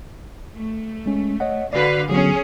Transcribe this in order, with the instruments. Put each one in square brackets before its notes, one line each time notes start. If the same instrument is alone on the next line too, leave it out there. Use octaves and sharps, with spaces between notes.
[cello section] A3
[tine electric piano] G#3 C#4
C#5 D#5 F#5
[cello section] D3 B4 F5 [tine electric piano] F#4 D5
[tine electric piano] D3 F#3 B3 [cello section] C#4 G#4